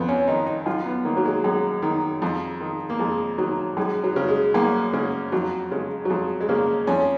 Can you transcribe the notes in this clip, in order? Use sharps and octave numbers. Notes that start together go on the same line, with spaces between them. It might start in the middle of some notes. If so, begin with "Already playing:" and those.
Already playing: F2 B3
C#4
D#3 D#4
D#4
F#2 F4
B3
D#3 A#3
F#3
G#3
F#2 G#3
D#3
F2
D#3
A#3
F2 G#3
D#3 F#3
F#2 G#3
F#3
C#3
G#3
F#2 A#3
C#3 G#3
F2 F#3
C#3 G#3
F#3
F2 G#3
G#3
C#3 A#3
F2 C#4